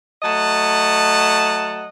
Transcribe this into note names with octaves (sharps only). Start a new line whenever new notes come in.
F#3 A3 D#5 F#5 A5